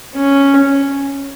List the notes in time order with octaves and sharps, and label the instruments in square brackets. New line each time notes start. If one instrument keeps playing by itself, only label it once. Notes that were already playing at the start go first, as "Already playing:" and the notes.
[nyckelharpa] C#4